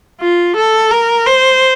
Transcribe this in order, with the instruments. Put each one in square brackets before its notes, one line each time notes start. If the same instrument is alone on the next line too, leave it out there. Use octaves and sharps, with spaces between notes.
[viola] F4
A4
A#4
C5